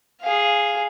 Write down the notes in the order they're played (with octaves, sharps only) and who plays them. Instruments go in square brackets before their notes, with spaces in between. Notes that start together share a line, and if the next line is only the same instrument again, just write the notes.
[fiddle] G#4 F5